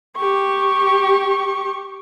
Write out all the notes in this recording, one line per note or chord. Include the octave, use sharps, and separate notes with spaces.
G4 C#6